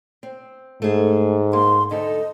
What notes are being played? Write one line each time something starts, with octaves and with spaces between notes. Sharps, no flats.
C4
G#2 A3 G#4
A#3 C6
D2 D#4 A4 D#5